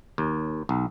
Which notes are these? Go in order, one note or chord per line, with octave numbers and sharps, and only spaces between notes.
D#2
B1